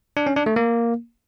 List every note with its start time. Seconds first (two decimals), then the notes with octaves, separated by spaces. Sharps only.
0.17 D4
0.27 C#4
0.36 D4
0.46 A3
0.56 A#3